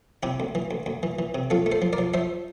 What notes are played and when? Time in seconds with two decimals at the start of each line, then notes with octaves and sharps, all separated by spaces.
0.23 C3 E4 G4
0.40 D2
0.55 E3
0.71 D2
0.86 D2
1.03 E3
1.19 E3
1.35 C3
1.50 F3 F4 A4
1.66 A3
1.72 A4 C5
1.82 F3
1.93 A#4 D5
1.98 F3
2.14 F3 C5 E5